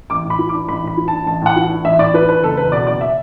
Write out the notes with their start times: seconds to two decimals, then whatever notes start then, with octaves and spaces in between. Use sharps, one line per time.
0.10 A1 D6
0.25 A2
0.30 B5
0.39 E3
0.49 D6
0.54 D4
0.68 A1 B5
0.83 A2 B5
0.97 E3
1.08 D4 A5
1.26 A1 A5
1.41 A2 F#5
1.56 E3
1.70 D4
1.85 A1 E5
1.99 A2 D5
2.14 E3 B4
2.29 D4 B4
2.42 F#1 A4
2.57 E2 B4
2.72 B2 D5
2.87 F#1 D5
3.01 E5